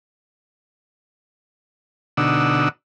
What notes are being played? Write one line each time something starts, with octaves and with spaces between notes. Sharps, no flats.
B2 D3 D4 D#4 F#5 E6